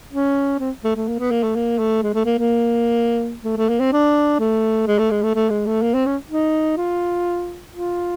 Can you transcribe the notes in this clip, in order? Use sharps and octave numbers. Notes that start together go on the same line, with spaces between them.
C#4
C4
A3
A3
A#3
B3
A#3
A3
A#3
A3
G#3
A3
A#3
A#3
A3
A3
A#3
C4
D4
A3
G#3
A3
G#3
A3
A3
G#3
A3
A#3
C4
C#4
D#4
F4
F4